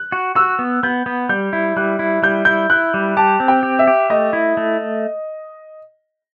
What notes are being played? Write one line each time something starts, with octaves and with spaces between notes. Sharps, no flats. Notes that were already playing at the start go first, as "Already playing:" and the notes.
Already playing: F#6
F#4
F#4 E6
B3
B3 G6
B3
G3 G6
E4
G3 F#6
E4
G3 G6
E4 G6
E4 F#6
G3
G4 A5
C4
G5
G4
E5
G4
A3 D#5
E4
A3